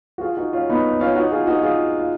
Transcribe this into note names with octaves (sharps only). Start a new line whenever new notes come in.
F#4
F4 G#4
D#4 F#4
C#4 F4
B3 D#4
C#4 F4
D#4 F#4
F4 G#4
D#4 F#4
F4 G#4
F4